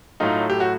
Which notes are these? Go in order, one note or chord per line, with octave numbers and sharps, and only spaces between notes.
A2 F#3 A3 D#4 F4
G4
F#4